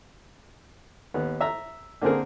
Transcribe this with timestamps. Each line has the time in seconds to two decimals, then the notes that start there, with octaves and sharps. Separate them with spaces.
1.14 D#2 B3
1.41 E5 A#5 E6
2.02 D3 A#3 C4 G#4 A#4